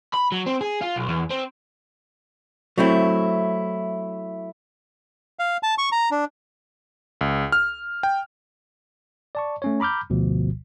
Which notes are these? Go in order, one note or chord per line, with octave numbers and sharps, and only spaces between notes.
B5
F#3
C4
G#4
F4
B1
E2
C4
F#3 A3 C4 E4
F5
A5
C#6
A#5
D4
C#2
F6
G5
D5 A5 C#6
A3 C#4 C#5
A#5 B5 D6 F6 G6
G1 D2 B2 F3